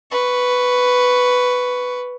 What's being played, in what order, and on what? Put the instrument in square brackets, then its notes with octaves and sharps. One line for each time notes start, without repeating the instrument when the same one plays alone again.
[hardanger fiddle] B4 C#6